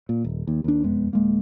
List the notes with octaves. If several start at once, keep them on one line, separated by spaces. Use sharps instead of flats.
A#2
D#1
D#2
D#2 D4
E1 F2 G#3 B3
D1 G#3 A#3